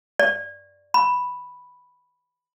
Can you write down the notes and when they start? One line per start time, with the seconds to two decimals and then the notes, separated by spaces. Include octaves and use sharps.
0.19 D5
0.94 B5